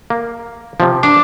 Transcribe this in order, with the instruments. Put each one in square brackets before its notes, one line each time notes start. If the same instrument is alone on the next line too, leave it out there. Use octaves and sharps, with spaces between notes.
[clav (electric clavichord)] A#3
C3 F3
[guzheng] D4